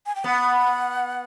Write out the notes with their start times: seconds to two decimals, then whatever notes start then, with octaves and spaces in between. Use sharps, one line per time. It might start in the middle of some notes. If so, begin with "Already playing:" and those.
0.06 G#5
0.15 G5
0.24 B3 F#5